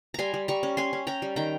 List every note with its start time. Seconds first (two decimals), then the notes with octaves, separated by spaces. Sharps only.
0.14 G3 G#5 A#5 C6
0.34 G3
0.48 G3 A#5 C#6
0.63 C#4
0.77 C#4 G#5 C6
0.93 C#4
1.07 C#4 G5 A#5
1.22 G3
1.36 D#3 G5 A#5